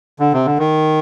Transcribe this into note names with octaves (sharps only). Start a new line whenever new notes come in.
D3
C3
D3
D#3